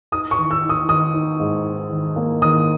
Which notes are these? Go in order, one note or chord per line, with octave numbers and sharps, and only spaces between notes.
D#4 D#6
C#6
D#3
E6
D#4
D#6
D#3 D#6
D#4
G#2
D#4
D#3
A#3
D#3 D#6